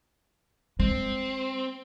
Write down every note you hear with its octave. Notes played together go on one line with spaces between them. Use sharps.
G#3 C4